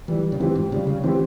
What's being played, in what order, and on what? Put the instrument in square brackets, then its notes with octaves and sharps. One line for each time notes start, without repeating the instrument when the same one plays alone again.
[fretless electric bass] E3 [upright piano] G3
[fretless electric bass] C#3
[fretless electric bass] E3 [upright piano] C4 G4
[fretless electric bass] G#2
[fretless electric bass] C#3 [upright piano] G3
[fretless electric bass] C#3
[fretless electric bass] E3 [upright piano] C4 G4